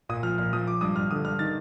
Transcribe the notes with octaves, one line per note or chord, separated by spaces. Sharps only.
A#2 D#6
F3 F6
A#2 F6
F3 D#6
F3 D6
G2 D#6
G2 F6
D3 D#6
G2 F6
D#3 A6